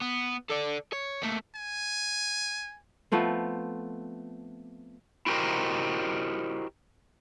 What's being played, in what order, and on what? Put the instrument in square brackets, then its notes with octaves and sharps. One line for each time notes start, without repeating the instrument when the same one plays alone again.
[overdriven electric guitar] B3
A4 D5
C#5
A3 A#3
[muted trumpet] G#5
[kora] F3 A3 B3 C4
[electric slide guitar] E4 F#4 G4 A#4 C5 D#5